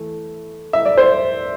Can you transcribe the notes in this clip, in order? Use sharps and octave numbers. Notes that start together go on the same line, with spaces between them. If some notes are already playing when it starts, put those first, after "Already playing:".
Already playing: E3 A3
E5
D5
C5